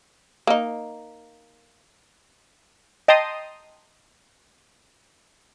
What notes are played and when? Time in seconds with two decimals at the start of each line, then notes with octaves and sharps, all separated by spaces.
0.47 A#3 D#4
3.08 D#5 G5 A5 A#5 C6 D#6